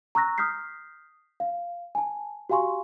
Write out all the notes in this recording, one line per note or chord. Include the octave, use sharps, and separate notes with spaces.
A#5 C#6 E6 F#6 A#6
D#6 F6 G6 B6 C7
F5
G#5 A5
F#4 G4 F5 G#5 C6 C#6